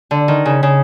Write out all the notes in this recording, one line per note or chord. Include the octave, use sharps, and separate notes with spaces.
D3
D#3
C#3
C#3